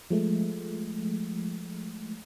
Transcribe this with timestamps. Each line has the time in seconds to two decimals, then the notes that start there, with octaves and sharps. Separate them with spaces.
0.10 F3 G#3 A3